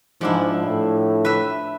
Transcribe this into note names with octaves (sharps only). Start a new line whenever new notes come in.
G#2 F3 D4 E4
A2
B4 E5